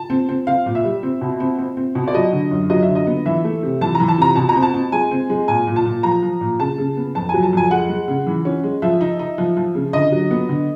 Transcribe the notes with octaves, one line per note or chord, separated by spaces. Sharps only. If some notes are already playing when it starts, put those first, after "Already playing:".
Already playing: A5
C4
C4
C4 F5
A#2
E5
G3
C4
B2
C4
C4
C4
B2
D5
F#3 D#5
D3
F#2
F#3 D#5
E5
D3
D#5
B3
E3 E5
A3
C3
E3 A5
A#5
E3
A5
C3 A#5
B2 A5
A#5
C4
A5
C4
G#3 G#5
C4
G#3
A#2 G#5
A#2
A5
A#2
F3 A#5
F3
A#2
C#3 A5
C#3
B3
F2 A5
F#3 G#5
A5
F2 G#5
G#3 F#5
G#3
C#3
E3
C#4
G#3
F3 E5
D#4
D#4
F3
F3
C#3
D3 D#5
F#3
B3
D3